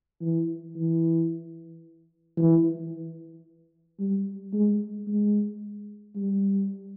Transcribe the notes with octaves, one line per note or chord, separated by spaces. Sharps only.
E3
E3
E3
G3
G#3
G#3
G3